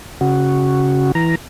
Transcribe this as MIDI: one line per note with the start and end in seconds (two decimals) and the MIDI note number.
0.21 1.12 49
0.21 1.12 66
1.15 1.35 52
1.15 1.35 82